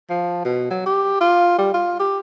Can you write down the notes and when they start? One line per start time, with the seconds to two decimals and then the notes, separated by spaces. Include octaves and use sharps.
0.10 F3
0.45 B2
0.70 F#3
0.86 G4
1.20 F4
1.58 G3
1.74 F4
2.00 G4